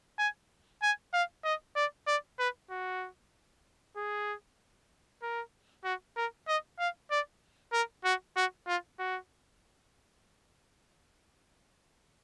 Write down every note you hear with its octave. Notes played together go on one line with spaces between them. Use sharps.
G#5
G#5
F5
D#5
D5
D5
B4
F#4
G#4
A#4
F#4
A#4
D#5
F5
D5
A#4
F#4
F#4
F4
F#4